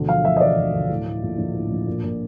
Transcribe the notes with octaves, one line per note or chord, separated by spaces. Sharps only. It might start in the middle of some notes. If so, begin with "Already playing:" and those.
Already playing: E1 D2
F3 F5
F3 E5
D#5
E1 D5
D2
D2
A2
A2
A#1
A#1
A2
A#1
A#2
A#2